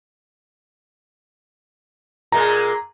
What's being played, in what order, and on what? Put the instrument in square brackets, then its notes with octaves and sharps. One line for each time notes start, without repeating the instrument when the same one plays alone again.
[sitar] A#2 G#3 A#4 [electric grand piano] A#5